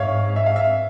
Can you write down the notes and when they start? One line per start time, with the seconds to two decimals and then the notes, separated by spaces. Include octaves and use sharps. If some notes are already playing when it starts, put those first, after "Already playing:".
Already playing: G#2 C#5 E5 F5
0.36 E5
0.46 F5
0.56 E5